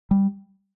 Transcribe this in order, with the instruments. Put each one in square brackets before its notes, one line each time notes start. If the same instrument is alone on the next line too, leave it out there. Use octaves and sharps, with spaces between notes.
[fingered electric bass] G3